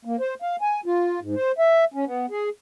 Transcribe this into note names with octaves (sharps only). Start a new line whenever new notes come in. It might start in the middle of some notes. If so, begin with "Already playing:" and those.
A#3
C5
F5
G#5
F4
G#2
C5
E5
C#4
B3
G#4